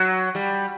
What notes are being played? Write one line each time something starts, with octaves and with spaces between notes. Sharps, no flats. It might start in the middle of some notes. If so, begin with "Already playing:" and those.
Already playing: F#3
G3